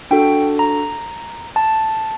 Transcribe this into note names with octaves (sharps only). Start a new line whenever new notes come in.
D4 F#4 A4 G5
A#5
A5